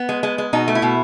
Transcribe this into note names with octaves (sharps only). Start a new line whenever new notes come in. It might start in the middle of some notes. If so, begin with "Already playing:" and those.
Already playing: B3
G#3
G#3
G#3
B2 D#4
A3
E4
B2